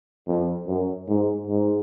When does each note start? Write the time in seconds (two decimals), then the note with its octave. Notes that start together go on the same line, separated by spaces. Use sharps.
0.28 F2
0.68 F#2
1.08 G#2
1.47 G#2